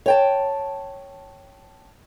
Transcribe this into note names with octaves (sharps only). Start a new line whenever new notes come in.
C#5 G5 A5